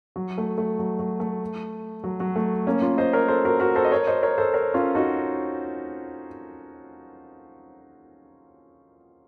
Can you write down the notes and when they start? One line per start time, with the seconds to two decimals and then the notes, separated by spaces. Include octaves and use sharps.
0.16 F#3
0.38 A3
0.58 A3
0.79 F#3
0.99 F#3
1.20 A3
2.04 F#3
2.20 F#3
2.36 A3
2.67 A#3 C#4
2.81 C#4 F4
2.98 C5 D#5
3.13 A#4 C#5
3.28 A4 C5
3.45 F#4 A#4
3.60 F#4 A#4
3.75 A4 C5
3.85 D#5
3.91 A#4 C#5
4.07 C5 D#5
4.23 A#4 C#5
4.38 A4 C5
4.54 A#4 C#5
4.74 C#4 F4
4.95 D#4 F#4